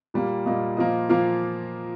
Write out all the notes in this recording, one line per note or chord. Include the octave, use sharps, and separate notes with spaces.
A#2 G3 A#3
A#2 G3 A#3 D#5
A#2 F3 A#3 D#5
A#2 F3 A#3 F5